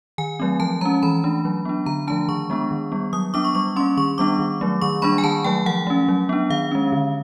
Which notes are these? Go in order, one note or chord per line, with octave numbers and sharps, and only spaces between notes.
D#3 G#5
F#3 A3 C4
F3 A5
G#3 C#4 A#5
E3 B5
A3 D4
F#3
B3 D4
D3 A#5
F3 A3 D4 A5
D#3 C#6
G#3 B3 D4
D#3
G3 B3
F#3 D#6
B3 D4 D6
C#6
G3 C#6
A#3 C#4 C6
D#3 C#6
G3 B3 D4 D6
D#3
F#3 A3
D#3 C#6
G3 A#3 D4 B5
G#5
D#3 A5
F#3 A3 G5
F3 F#5
A3 C#4
F#3
B3 D4
D#3 F5
G#3 C#4
D3